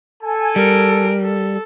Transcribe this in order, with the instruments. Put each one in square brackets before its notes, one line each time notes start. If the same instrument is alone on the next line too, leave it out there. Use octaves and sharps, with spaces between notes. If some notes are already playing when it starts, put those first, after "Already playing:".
[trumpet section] A4 G#5
[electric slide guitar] G3 [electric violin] A#4 D7
[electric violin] A4